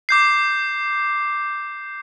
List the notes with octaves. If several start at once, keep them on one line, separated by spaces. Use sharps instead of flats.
D6 G6 C7